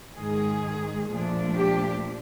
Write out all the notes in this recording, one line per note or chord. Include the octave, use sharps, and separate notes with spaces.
G#2 D#3 G#3 G#4
A#2 F3 A3 D4
G4